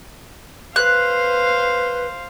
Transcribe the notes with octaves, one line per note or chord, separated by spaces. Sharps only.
B4 C5 F5 F#6